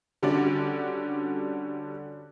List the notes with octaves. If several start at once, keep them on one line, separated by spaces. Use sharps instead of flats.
D3 G3 C#4 D4 F#4 D5